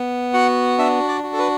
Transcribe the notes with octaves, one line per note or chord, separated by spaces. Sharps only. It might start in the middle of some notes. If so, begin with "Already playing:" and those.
Already playing: B3
F#4 F#5
D4 E5
D5
F#4
A4
B4